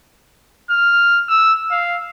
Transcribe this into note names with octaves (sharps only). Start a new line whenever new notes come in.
F6
E6
F5